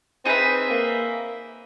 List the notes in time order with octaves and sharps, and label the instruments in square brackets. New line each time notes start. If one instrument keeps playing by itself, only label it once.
[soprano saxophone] C4 [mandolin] D#4 G#4 B4 E5
[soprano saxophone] A#3